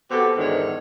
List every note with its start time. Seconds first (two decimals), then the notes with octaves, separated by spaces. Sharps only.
0.11 B2 C4 F#4 G4 A4
0.37 E2 G#2 D3 D#3 C#5